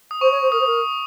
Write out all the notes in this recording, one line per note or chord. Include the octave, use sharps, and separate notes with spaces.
D#6
C5 C#6
C#5
C5
A#4 D#6
C5
A#4